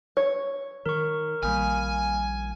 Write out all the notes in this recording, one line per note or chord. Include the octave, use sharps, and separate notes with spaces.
C#5
D#3 A#4 C#6
A#1 D#3 G3 A#3 G#5 F6